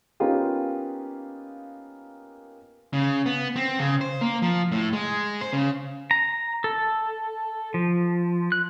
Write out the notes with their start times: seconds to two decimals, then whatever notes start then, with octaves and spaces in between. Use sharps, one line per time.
0.20 A#3 B3 C#4 D#4 F4 G4
2.93 C#3
3.26 B3
3.56 C4
3.79 C#3
4.01 C5
4.21 A#3
4.42 F3
4.72 A2
4.93 G#3
5.41 C5
5.53 C#3
6.11 A#5
6.64 A4
7.74 F3
8.52 F#6